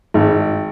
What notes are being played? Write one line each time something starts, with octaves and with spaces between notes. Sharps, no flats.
G#1